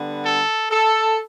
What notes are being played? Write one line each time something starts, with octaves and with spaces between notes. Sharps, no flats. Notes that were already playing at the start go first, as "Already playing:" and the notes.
Already playing: D3 G3 B3
A4
A4